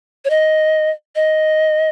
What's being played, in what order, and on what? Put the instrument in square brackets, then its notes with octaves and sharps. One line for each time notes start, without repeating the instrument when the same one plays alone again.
[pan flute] C#5
D#5
D#5